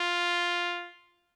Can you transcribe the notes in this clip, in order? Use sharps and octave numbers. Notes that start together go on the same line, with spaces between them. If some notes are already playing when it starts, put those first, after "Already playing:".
Already playing: F4